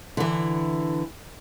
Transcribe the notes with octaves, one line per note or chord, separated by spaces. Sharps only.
D3 E3